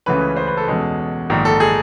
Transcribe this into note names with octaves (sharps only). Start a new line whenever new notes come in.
C#2 C#3 E3 A3 C#4 B4
C5
B4
A4
E2 B2 G#3 C#4
A#1 G#2 D#3
A4
G#4